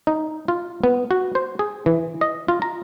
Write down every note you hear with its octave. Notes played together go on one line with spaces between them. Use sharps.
D#4
F4
B3
F#4
C5
G#4
E3
D#5
F4
A#5